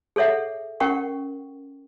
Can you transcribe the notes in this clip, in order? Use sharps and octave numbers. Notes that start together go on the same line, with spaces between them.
G#4 A4 C#5 E5 F#5
C#4 A#4 F#5 G5 C#6